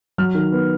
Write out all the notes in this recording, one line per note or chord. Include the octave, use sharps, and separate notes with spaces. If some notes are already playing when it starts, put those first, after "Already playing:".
F#3 F6
D#3
B3